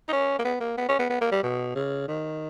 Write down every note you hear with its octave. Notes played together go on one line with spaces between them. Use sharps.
D#4
C#4
A#3
B3
A#3
B3
C#4
B3
B3
A#3
G3
B2
C#3
D#3